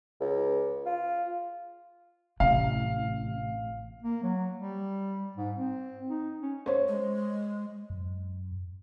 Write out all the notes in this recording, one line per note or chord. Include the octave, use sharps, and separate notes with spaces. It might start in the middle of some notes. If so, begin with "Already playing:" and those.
C#2
F4
A1 C3 F5
A#3
F#3
G3
G#2
C4
D#4
C#4
C5 C#5
G#3
F#2